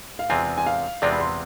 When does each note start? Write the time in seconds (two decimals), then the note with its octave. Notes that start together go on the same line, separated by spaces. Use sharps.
0.19 F5
0.30 E2 C3 G#3 C4 F4 G#5
0.58 G#5
0.67 F5
1.02 E2 C3 G#3 C4 F4 D5
1.13 B5
1.20 C6